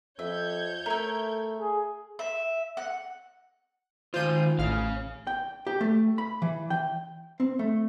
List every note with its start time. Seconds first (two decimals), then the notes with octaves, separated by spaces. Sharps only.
0.19 F2 C#5 E5 G6 G#6
0.86 A3 A#4 E5
1.60 G#4
2.19 E5
2.77 F#5
4.14 D#3 F4 C5 G6 D#7
4.59 A1 C#5 F5 F6
5.27 G5
5.67 G4
5.81 A3
6.18 B5
6.42 E3
6.70 G5
7.40 C4
7.59 A3